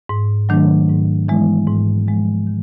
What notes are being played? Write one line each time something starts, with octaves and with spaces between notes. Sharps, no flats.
G#2
D#3 F#3 A3 D4
G#2
E3 G#3 B3 E4
G#2
F3 G#3
D#3